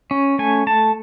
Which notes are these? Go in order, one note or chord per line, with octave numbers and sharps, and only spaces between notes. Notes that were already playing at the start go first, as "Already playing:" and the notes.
C#4
A3 G#5
A3 A5